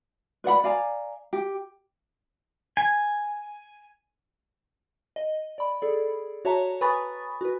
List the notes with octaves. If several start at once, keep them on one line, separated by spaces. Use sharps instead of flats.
B4 D5 F#5 B5
D5 F5 G#5 A#5
G4
G#5
D#5
D5 B5
G#4 A4 D5
F#4 C#5 E5 A5 A#5
B4 G#5 B5 C#6 D#6 A6
F#4 B4